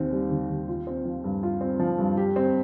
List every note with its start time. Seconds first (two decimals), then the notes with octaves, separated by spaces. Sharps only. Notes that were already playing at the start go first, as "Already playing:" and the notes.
Already playing: D#2 D#3 C4
0.12 G3
0.31 D#3
0.50 D#2
0.68 F4
0.87 C4
1.05 F3
1.24 G2
1.43 F4
1.61 C4
1.79 F3
1.99 G2
2.17 G4
2.36 C4